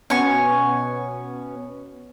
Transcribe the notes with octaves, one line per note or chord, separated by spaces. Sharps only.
B2 B3 C#4 G#5 C#6